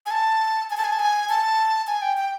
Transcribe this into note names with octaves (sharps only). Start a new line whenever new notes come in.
G#5
A5
G#5
A5
G#5
A5
G#5
A5
G#5
G5
G5